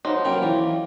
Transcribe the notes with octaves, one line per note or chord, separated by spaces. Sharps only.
F3 D#4 F#4 B4 C#5 C6
F#3 A#3 C#4 F4 G5 B5
E3 D5 F5